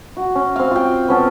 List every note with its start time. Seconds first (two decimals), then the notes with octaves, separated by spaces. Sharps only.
0.17 F#4
0.35 C#4
0.56 C4 F5
0.71 F4 G5
1.08 B3 C#4 A4